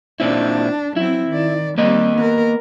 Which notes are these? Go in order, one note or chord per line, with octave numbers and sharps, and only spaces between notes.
A#2 C4 D4 E4
F#3 C4 E4
D#3 D5
G3 A#3 C4 D#5
B3 A#4